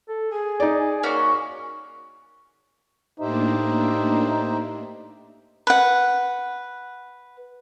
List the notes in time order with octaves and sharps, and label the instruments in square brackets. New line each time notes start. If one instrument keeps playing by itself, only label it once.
[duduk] A4
[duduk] G#4 [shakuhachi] G#5
[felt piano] D#4 D5
[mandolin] A#3 C#4 F#4
[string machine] A2 A#3 D4 [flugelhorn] D#4 [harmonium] G4 C5 E5
[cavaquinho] B4 F#5